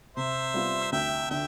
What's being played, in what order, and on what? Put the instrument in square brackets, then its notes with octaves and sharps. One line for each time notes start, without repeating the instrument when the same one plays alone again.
[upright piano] C3 [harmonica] C5 E5
[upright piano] G3 B3 F4
[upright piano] D2 [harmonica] E5 G5
[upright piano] D3 [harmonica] E5 G5